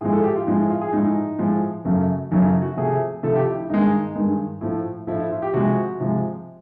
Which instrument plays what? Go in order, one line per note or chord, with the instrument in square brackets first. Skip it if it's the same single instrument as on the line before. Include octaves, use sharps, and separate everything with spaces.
[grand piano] A2 F3 G#3 G#4
A4
G4
F4
A2 F3 G#3 D#4
E4
F4
G#4
A2 F3 G#3 D#4
A2 F3 G#3
F#2 C#3 F#3 A3
F#2 C#3 F#3 A3 D#4
E4
F#4
C3 F3 A3 G#4
C3 F3 A3 A4
G4
E4
E4
G2 D#3 G#3 D#4
G2 D#3 G#3
A2 F3 A3
A2 F3 A3 E4
E4
F4
G4
C3 F3 G#3 F#4
C3 F3 G#3